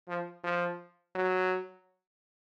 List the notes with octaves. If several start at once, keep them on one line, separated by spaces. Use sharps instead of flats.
F3
F3
F#3